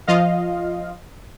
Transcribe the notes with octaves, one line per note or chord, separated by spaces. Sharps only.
F3 F4 D#5 F5